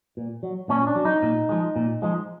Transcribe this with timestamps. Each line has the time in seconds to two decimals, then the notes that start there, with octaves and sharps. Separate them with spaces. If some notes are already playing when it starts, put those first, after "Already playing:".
0.17 A#2
0.43 F#3
0.69 A#2 C#4
0.87 D4
0.96 F#3
1.05 D#4
1.22 A#2
1.49 F3 G#3
1.76 A#2
2.02 F3 G#3